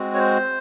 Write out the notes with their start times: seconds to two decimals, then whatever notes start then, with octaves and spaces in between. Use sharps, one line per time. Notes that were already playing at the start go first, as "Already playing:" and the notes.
Already playing: G#3 C4 F#4
0.14 C#5
0.19 C5